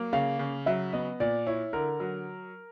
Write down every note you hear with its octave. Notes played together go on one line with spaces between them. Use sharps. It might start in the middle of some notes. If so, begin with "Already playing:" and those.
Already playing: F#3 A#3
C#3 F5
C#3
F#3 E5
B3 D#5
A#2 D5
E4 C#5
D3 A#4
F#3